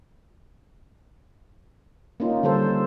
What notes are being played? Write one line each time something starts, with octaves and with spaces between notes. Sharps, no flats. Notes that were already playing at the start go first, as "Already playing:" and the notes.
A#3 C#4 D#4 F4
D3 G3 A4 C5